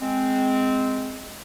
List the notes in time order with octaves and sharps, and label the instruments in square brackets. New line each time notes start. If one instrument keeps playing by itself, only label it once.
[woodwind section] G#3 C4